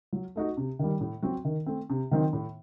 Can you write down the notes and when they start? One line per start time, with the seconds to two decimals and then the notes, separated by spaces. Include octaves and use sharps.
0.13 F#3
0.36 A3 D#4 F#4
0.57 C3
0.79 D#3 G3
1.01 A2
1.22 F#3 C4 F#4
1.45 D#3
1.66 A3 C4
1.90 C3
2.11 D#3 F#3 C4 D#4
2.33 A2